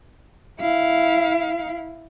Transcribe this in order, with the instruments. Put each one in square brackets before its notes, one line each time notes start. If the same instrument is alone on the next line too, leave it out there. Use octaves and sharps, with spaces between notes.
[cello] E4 F5